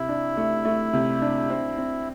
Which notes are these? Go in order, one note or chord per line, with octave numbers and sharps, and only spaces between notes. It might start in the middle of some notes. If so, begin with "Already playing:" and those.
Already playing: C3 E4
D4
A3
A3
C3
D4
C4
C4